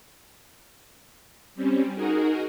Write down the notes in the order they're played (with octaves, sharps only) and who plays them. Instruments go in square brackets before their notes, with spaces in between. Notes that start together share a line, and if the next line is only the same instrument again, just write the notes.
[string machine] G3 C4 C#4
D#4 F#4 G#4 A#4